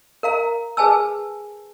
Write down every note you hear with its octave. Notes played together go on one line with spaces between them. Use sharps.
A#4 F5 A#5
G#4 B4 G#5 A5 E6